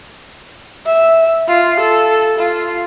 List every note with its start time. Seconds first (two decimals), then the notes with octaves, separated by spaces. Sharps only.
0.86 E5
1.48 F4
1.80 A4
2.39 F4